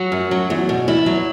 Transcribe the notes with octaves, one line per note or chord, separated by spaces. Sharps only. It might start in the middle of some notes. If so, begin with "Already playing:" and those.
Already playing: F#3 F#4
F#2
F#3
E2
B2
E2 E4
F#3